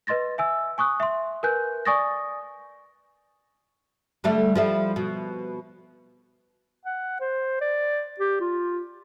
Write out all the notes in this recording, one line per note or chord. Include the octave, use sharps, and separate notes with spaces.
B4 D#5 C6 A6 A#6
E5 G#5 E6
G#5 C#6 D#6 F#6
E5 C6
A#4 B4 G#5 F#6 G6
D5 G#5 C#6 D#6 A6 A#6
D3 G3 A3
F3 G3 E4
B2
F#5
C5
D5
G4
F4